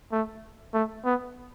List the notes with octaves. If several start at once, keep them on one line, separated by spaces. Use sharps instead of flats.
A3
A3
B3